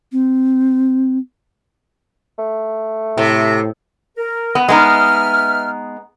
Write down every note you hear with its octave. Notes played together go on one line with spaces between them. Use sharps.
C4
A3
A2 C3
A#4
B3
G#3 B3 D#4 B4 E5 F6